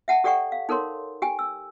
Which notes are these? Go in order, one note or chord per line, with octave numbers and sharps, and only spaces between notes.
E5 F#5 A5
G4 A4 D5 F#5 G5 C#6
F5
D#4 A4 A#4 C#5 C6
G4 G5 G#5
E6